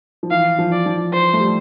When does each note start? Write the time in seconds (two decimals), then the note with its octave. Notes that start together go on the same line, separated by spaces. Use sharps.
0.23 F3
0.31 E3 F5
0.59 F3
0.72 D5
0.86 F3
1.13 C5
1.33 A3
1.41 G3